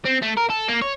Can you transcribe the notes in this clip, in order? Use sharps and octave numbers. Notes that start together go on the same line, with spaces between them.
C4
A3
A#4
A4
A#3
C#5